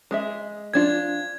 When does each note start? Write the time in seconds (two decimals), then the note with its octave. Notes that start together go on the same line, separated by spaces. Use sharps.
0.11 G#3 G#4 E5
0.74 F3 D4 F4 G#6